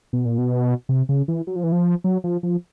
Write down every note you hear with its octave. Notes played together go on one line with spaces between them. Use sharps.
B2
A#2
B2
C3
C#3
E3
F#3
F3
E3
F3
F#3
F3
F3